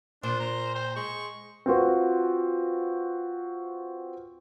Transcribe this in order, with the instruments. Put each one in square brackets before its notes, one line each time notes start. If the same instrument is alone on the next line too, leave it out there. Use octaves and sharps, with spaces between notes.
[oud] A#2 [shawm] D4 [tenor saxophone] C5
[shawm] A#5
[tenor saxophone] C5 [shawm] G5
[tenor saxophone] G#3 [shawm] C#6
[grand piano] C4 F4 F#4 B4